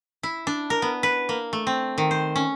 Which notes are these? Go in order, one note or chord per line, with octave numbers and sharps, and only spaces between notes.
E4
D4
A#4
B3
B4
A#3
A3
C4
D#3
C5
C#4